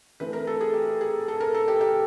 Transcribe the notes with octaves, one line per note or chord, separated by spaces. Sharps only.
E3 A3 C4 B4
A#4
A4
G#4
G4
G#4
A4
A#4
A4
G4
G4